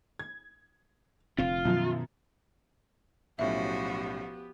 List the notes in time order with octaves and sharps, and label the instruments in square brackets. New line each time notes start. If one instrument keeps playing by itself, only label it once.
[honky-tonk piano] G#6
[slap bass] F1 D3 C4 [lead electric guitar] F4
[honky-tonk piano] F#2 F3 [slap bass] B2 D#3
[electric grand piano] B1 A2 C#4 [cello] F3 F#4 [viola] B3 G4 [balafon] E5